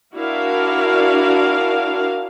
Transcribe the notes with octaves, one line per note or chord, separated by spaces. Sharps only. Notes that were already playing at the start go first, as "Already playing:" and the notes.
D4 E4 F#4 A#4 F5